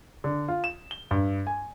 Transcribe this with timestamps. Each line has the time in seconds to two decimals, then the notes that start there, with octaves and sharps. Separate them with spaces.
0.24 D3
0.48 F4
0.64 E7
0.91 G7
1.11 G2
1.47 G#5